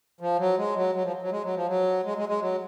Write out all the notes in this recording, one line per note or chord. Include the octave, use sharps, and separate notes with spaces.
F3
F#3
G#3
F#3
F#3
F3
F#3
G#3
F#3
F3
F#3
G#3
G#3
G#3
F#3